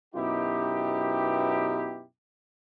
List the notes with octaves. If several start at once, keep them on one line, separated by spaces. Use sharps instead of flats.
F#2 B2 B3 D#4 E4 G4